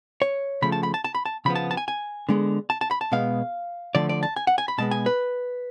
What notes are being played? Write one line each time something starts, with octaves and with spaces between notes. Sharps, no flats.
C#5
C#3 F3 A3 B5
A5
B5
A5
A5
B5
A5
C#3 F3 B3 B5
A5
A5
G#5
G#5
D3 G#3 B3
A5
A5
B5
A5
B2 G#3 B3 F5
D3 F3 A3 D5
D5
A5
G#5
F#5
G#5
B5
B2 G#3 B3 A5
G#5
B4